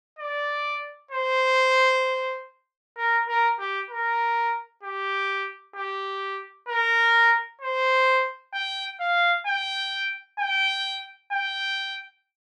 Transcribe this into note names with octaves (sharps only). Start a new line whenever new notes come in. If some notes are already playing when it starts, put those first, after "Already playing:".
D5
C5
A#4
A#4
G4
A#4
G4
G4
A#4
C5
G5
F5
G5
G5
G5